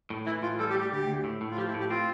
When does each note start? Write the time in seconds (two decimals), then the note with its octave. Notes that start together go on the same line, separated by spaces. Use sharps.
0.10 A2
0.26 E3 E4
0.42 A2 F4
0.59 G3 A4
0.70 G4
0.75 G3
0.81 G4
0.92 D2 G4
1.08 D2
1.24 A2
1.41 A2
1.51 F4
1.57 F3 G4
1.68 E4
1.74 A2
1.80 G4
1.90 C4 F4